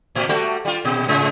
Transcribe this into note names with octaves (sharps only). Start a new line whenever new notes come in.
A2 C3
G3 A3 F#4
G3 F4
A#2
G#2 C#3 G#3